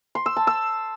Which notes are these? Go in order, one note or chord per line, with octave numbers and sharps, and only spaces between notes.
C6
E6
A5
E6